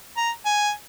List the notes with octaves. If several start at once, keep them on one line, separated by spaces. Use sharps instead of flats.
A#5
G#5